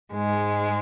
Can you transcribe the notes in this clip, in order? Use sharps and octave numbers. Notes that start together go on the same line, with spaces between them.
G#2 G#3